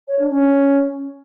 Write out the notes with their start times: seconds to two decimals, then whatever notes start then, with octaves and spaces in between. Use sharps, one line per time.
0.07 C#5
0.18 D4
0.30 C#4